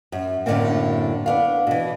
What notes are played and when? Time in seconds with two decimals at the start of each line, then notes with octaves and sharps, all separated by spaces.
0.12 F#2
0.46 F#2 A2 D3 A3 A#3 C4
1.26 B3 D4 F5
1.67 B2 E3